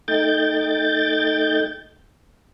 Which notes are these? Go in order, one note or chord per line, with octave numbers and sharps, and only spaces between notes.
A3 D#4 G5 G6 A6